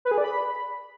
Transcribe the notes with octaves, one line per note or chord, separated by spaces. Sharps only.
B4
G#4
D5
B5